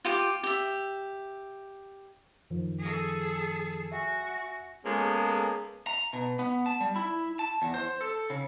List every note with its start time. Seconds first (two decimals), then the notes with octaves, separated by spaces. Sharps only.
0.05 F4 G4 D6
0.43 G4 E5
2.50 F#2 D#3 F3
2.79 G#4 A4
3.92 F#4 E5 G#5
4.85 G#3 A#3 B3 C#4 G#4 A4
5.87 A#5
6.13 B2
6.39 B3
6.66 A5
6.81 G3
6.96 E4
7.39 A5
7.62 E2
7.74 C5
8.01 A4
8.30 C#3